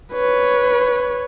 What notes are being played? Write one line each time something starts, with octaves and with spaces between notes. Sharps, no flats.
B4 C#5